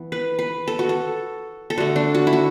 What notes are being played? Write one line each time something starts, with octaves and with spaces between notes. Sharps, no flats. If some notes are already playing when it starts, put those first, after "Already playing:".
Already playing: E3 B3
B4
B4
A4
F#4
A4
A4
D3 A3 F#4
D4
F#4
E4
F#4